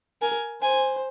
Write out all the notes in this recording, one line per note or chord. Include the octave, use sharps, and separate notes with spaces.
A#4 G#5
C5 G#5